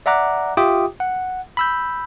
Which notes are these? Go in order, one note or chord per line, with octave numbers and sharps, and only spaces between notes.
D5 E5 F#5 A#5 D6 F#6
F4 G4 E5 G5 D6 D#6
F#5
B5 E6 G6